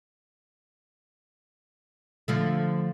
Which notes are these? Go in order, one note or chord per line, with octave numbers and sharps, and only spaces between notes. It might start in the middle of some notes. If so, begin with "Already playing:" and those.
D3 F3 A3